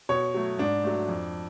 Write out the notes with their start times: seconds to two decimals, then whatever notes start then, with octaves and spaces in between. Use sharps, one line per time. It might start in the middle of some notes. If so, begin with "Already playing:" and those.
0.09 B2 C#5
0.34 F#3 A3
0.58 G#2 D4
0.84 F#3 A3
1.09 F2